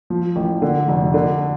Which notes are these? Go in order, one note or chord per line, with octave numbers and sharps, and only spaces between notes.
F3
A1
D3
F1
D3